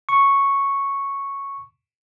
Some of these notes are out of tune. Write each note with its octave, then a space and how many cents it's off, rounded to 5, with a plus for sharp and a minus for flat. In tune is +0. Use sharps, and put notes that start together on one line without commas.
C#6 -5